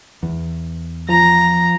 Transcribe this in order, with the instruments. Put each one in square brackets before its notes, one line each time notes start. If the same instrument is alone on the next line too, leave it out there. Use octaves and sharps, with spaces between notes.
[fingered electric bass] E2
[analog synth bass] F3 [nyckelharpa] A#5